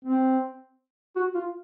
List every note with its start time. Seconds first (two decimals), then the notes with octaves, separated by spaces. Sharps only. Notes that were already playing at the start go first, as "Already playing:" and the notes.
0.05 C4
1.16 F#4
1.35 F4